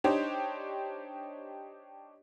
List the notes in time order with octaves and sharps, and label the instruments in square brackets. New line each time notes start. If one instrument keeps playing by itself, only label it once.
[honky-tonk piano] D4 D#4 G4 C5 C#5